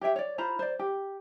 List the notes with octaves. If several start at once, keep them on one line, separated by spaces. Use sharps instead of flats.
G4 C#5 E5 G5
C#5 D5
F4 C5 A#5 B5
C5 D5
G4